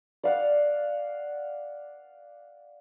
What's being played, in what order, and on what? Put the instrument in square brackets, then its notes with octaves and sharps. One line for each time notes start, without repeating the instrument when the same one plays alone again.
[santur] D5 F5 F#5